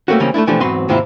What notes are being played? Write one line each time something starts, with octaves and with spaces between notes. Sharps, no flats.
G3 A3 A#3 C4 C#4 F#4
C#3 E3 G3 A#3 C4 C#4
A3 A#3 D4 E4
B2 E3 F3 A3 D4 G4
E2 G#2 F#3 C4 B4 C6
D#2 G#2 C3 E4 F4 A#5